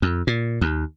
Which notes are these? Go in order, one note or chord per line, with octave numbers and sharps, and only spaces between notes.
F2
A#2
D#2